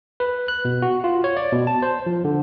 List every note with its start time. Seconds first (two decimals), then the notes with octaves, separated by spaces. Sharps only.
0.20 B4
0.48 F#6
0.65 B2
0.82 F#4
1.04 F4
1.24 C#5
1.37 D5
1.52 B2
1.67 A5
1.82 C5
2.06 F3
2.25 D3